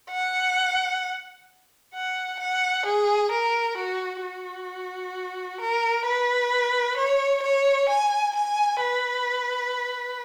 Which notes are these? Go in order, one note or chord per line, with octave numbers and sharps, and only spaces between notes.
F#5
F#5
F#5
G#4
A#4
F#4
F#4
A#4
B4
C#5
C#5
G#5
G#5
B4